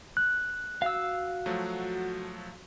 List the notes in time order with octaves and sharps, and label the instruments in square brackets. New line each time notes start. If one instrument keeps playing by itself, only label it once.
[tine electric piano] F#6
[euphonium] F#4 [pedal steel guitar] F5 E6
[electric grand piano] F3 F#3 A3